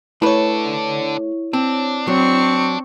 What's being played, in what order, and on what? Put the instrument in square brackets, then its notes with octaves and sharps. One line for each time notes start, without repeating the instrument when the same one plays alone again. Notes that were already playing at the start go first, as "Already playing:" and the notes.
[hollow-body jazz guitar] A3 B4 [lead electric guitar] D4 A4 [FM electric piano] E4 C#5
[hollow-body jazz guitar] C4 [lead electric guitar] D4
[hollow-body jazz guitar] F#3 [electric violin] C4 C#6